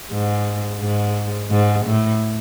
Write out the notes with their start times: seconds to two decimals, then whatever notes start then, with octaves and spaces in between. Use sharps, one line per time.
0.11 G#2
0.81 G#2
1.51 G#2
1.85 A2